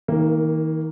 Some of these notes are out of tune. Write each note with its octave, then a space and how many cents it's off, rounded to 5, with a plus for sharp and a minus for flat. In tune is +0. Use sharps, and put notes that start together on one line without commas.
D#3 +35 A#3 +0